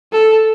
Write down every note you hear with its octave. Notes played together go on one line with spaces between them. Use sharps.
A4